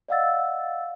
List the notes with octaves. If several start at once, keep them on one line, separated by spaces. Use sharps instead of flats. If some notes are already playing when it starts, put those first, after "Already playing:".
D5 D#5 F5 F#5 E6 A6